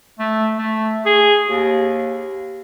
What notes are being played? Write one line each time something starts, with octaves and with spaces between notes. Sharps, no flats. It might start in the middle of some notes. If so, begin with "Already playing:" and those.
A3
A3
G#4
D#2